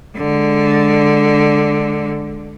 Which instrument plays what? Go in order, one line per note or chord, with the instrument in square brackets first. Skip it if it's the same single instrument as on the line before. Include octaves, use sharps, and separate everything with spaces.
[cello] D3 G#3